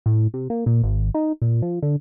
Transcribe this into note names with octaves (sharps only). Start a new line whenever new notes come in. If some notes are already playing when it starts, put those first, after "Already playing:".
A2
C3
A#3
A#2
G#1
D#4
A#2
F3
D3